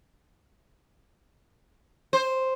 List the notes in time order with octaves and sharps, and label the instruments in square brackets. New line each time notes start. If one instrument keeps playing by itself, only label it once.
[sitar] C5